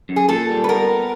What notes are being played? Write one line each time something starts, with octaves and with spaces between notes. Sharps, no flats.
F#2
G#4
A#2 A4
G3
B4
B3 A#4
B3